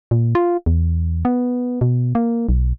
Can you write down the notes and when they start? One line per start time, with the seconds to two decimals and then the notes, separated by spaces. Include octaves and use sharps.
0.11 A#2
0.35 F4
0.66 E2
1.25 B3
1.81 B2
2.15 A#3
2.49 B1